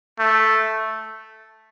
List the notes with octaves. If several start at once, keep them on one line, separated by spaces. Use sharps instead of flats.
A3